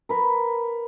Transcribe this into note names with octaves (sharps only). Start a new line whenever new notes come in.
A#4 B4